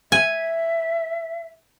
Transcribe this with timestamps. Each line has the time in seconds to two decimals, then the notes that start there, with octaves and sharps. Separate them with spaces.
0.12 E5 G#5